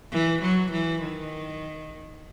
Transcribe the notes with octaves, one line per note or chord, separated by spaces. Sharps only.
E3
F#3
E3
D#3